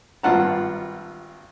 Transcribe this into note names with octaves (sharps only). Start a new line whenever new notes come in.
G#1 G2 F4 F#5 A5 A#5